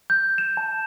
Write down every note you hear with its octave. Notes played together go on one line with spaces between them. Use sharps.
G6
E7
A5